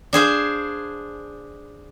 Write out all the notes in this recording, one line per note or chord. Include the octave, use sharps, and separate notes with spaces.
D4 G#4 C5 F5